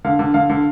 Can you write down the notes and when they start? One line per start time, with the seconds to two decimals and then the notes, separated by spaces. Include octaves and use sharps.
0.04 D3 F5
0.19 D3
0.34 D3 F5
0.50 D3